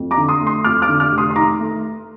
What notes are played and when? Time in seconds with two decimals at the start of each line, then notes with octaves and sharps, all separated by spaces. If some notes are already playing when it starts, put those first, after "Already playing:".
Already playing: F2
0.11 A#5 D6
0.17 D3
0.28 C6 D#6
0.41 A3
0.47 C6 D#6
0.64 F2 D6 F6
0.82 D6 F6
0.89 D3
1.00 D6 F6
1.12 F1
1.18 C6 D#6
1.30 C6
1.36 D#3 A#5 D6
1.60 A3